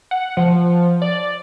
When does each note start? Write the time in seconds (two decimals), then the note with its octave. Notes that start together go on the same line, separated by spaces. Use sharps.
0.11 F#5
0.37 F3
1.02 D5